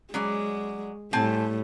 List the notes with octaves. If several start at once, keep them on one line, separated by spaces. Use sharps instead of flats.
F#3 G#3 C#4 D5
A2 G3 C4 G#5 A5